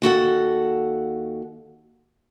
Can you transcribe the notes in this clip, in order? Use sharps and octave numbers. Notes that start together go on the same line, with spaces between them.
D#2 F#4 A4 F#5